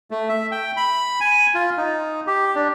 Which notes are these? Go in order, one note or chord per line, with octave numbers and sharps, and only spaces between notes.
A3
E5
G5
B5
G#5
F4
D#4
G4
D4